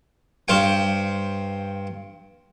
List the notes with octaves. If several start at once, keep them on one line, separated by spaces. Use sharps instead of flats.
G2 C5 F5 G5 C#6